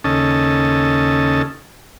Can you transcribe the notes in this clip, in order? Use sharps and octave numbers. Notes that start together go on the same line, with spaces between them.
D#2 C#3 C#4 A4 D#5 A5